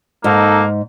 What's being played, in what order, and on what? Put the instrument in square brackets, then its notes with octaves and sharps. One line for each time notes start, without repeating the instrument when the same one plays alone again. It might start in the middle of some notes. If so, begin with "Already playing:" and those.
[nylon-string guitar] G#2 [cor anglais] A#3 [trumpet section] D#4 A4